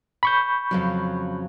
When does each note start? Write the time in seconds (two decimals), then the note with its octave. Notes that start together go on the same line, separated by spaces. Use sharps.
0.23 B5 C#6 G6
0.71 F2 C#3 F#3